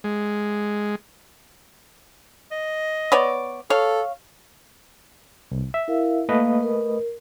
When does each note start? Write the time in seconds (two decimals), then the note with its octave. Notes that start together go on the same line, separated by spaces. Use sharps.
0.04 G#3
2.51 D#5
3.12 B3 C#5 D5
3.70 A4 C#5 F5
5.51 C2
5.74 E5
5.88 E4 A#4 F5
6.29 A3 A#3 B4 D#5 F5
6.63 A#4